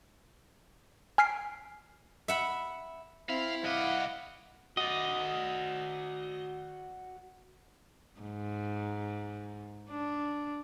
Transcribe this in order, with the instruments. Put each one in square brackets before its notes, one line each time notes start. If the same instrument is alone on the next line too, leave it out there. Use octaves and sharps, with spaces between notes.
[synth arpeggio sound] G#5 F6 B6 C7 D7
[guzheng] E5 F#5 B5
[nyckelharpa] C4 [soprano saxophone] E4 [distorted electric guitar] F5
[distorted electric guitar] C2 D#5 [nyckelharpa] F5 D6 [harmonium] F#5
[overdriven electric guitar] F#4 D5 [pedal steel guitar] D#5
[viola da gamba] G#2
D4